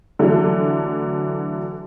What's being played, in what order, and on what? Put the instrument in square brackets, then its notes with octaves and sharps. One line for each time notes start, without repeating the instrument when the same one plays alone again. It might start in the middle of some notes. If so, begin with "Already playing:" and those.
[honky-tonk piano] D3 E3 F#3 A3